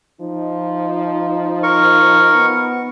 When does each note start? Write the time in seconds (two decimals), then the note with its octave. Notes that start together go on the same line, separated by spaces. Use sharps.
0.21 F3 D#4
1.63 A#4 C#6
2.35 B3